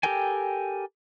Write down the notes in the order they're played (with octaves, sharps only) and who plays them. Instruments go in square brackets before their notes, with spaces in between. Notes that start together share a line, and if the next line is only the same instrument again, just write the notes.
[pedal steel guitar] G4 A4 A#4 G5 G#5